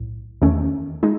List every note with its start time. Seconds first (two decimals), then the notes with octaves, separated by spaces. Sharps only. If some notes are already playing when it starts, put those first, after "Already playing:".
Already playing: B1 A2
0.42 E2 D#3 A3 C#4
1.03 G#3 D#4